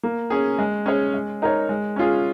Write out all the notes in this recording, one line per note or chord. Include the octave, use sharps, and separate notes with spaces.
A#3
C#4 G#4
G#3
C#4 G#4 C#5
G#3
D#4 A#4 C#5
G#3
C#4 F4 G#4